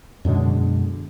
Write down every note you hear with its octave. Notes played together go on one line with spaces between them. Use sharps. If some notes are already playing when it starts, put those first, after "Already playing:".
F#2 B2 D3 G#3